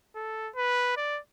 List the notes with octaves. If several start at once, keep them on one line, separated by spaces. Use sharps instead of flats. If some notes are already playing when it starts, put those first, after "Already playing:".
A4
B4
D5